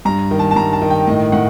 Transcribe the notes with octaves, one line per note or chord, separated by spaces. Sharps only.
G2 A#5
D#3
A5
A5
G2 A#5
A5
D#3
G5
A2 D#5
A2 F#5